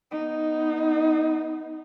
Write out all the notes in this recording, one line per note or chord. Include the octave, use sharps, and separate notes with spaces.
B3 D#4